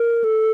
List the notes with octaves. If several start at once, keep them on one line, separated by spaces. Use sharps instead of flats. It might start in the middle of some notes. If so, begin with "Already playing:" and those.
Already playing: A#4
A4